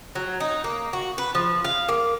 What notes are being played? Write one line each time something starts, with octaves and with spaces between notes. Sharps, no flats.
F#3
D#4
A#3
F#4
B4
F3
F5
A#3